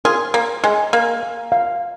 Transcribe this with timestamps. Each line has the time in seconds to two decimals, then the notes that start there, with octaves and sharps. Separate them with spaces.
0.05 F4 G#4 A#4
0.34 A#3 A#4
0.64 G#3 G#5
0.93 A#3 F5
1.23 F5
1.52 F5